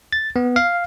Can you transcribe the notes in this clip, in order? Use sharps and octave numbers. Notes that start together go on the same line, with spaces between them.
A6
B3
F5